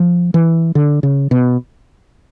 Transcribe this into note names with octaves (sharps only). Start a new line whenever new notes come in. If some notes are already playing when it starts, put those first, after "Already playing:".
Already playing: F3
E3
D3
C#3
B2